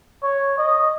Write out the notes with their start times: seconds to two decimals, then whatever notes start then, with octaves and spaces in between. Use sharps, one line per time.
0.23 C#5
0.58 D#5